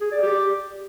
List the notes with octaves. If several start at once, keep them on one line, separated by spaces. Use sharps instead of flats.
G#4
D5
G4